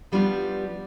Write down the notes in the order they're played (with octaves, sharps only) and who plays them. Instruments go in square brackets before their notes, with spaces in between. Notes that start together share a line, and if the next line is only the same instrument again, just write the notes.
[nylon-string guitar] F3 G3 B3 D4 F4